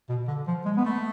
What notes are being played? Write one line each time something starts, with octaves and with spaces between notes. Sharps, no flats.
B2
D3
F3
G#3
B3
A3